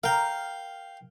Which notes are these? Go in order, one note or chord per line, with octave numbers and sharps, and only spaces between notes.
A#4 F5 G5